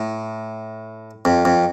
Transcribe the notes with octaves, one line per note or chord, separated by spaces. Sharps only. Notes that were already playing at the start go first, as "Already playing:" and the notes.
Already playing: A2
F2
F2